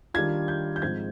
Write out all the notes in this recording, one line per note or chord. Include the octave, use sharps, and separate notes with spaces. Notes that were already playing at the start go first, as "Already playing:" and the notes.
D#3 G3 D4 F4 G#6
G6
G6
G#2 F3 C4 G#6